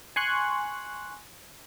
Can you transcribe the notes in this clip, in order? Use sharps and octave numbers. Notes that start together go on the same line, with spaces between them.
G#5 C6 C#6 F#6